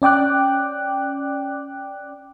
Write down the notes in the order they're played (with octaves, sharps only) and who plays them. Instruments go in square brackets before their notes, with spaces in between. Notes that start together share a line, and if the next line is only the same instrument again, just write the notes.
[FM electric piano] C#4 D5 G5 D6 F#6